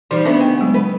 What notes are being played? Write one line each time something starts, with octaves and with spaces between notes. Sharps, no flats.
E3 F3 G3 D#4
D2 C#3 B3 C4 D4 E5
D#5 G5
F#3 G#3 C4
B4